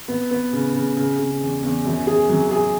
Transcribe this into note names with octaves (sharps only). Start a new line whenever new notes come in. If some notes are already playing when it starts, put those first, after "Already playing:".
B3
B3
C#3
C#3
C#3
C#3
E2
E2
F#2
G#4
F#3
G#4